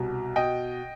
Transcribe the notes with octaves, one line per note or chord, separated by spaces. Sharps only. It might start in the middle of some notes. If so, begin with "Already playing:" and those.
Already playing: C2 B2
B2 D#5 G5